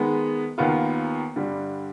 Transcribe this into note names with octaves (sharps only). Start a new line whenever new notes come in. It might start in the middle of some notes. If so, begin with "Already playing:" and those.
Already playing: D#3 G#3 B3
D#2 D#3 B3 F4
G2 D3 G3